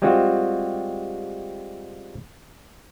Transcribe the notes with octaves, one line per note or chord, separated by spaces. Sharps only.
G3 G#3 C4 F4 F#4